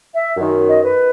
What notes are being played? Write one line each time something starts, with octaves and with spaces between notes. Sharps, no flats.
E5
F#2 D#3
D#5
B4